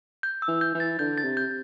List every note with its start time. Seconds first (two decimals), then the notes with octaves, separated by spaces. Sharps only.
0.23 G6
0.42 E6
0.48 E3
0.61 G6
0.75 E3
0.80 A6
0.99 D3 G6
1.18 A6
1.24 C3
1.37 G6